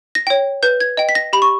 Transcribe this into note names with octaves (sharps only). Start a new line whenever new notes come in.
A#6
C#5 G5
B4 G6
G#6
D#5 G5
B6
A#6
G4 B5
C#6